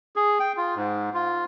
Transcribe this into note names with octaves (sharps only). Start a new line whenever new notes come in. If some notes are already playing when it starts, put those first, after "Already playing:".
G#4
G5
F4
G#2
F4